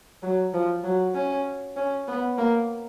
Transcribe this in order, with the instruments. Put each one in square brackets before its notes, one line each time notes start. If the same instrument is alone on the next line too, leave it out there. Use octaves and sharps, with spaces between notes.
[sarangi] F#3
F3
F#3
C#4
C#4
B3
A#3